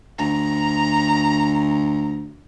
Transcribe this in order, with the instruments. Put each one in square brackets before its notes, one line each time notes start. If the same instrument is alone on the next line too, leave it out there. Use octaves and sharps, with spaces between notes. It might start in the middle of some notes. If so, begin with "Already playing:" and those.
[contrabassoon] D2 [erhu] A#5